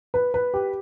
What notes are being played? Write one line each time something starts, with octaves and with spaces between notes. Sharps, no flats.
B4
B4
G4